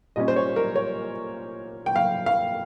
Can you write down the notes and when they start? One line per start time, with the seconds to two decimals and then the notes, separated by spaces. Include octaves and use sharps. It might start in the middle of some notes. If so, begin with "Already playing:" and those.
0.16 A#2 G3 C#4 D#5
0.28 C5
0.36 C#5
0.56 A#4
0.76 C#5
1.86 G5
1.96 F5
2.26 F5